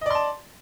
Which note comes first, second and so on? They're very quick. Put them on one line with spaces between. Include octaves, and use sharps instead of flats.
D#5 D5 C6 A5